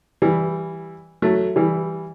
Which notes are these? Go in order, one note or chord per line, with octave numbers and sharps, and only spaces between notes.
E3 G3
F#3 A3
E3 G3